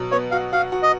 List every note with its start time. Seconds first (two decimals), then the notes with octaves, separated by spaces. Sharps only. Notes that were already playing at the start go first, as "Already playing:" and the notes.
Already playing: B2 F#3
0.11 B3 C#5
0.31 F#4 F5
0.53 F#4 F5
0.72 F#4
0.83 D#5